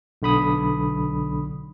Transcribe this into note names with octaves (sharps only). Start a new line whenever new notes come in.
B1 D3 B5 D#6